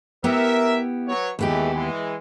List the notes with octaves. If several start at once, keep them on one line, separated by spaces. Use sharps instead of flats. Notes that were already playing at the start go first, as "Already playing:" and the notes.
B3 E4 G4 A#4 E5
F#3 B4 C#5
D#2 E3 G#3 A3 B3 G4
E3 G#3